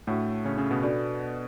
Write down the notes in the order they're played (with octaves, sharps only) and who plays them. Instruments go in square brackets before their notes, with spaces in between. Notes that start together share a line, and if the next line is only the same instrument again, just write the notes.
[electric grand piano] A2 A3 [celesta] D4 F#4 C#5 F#5
[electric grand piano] C#3 C#4
C#3 C#4
B2 B3
[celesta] D4 F#4 A4 D5